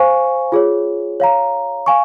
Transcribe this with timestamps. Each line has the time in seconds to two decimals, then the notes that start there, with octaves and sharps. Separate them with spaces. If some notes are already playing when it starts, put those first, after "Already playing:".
Already playing: C5 F5 G#5 C#6
0.52 F4 G#4 C#5
1.20 C#5 F5 A#5
1.86 F5 G#5 C#6